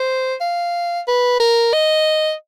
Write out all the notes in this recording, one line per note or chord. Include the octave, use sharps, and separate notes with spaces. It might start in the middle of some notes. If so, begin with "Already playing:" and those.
Already playing: C5
F5
B4
A#4
D#5